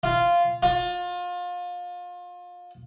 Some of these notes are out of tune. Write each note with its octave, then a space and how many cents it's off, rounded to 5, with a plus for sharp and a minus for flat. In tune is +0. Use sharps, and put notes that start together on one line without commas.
F4 -10
F4 +30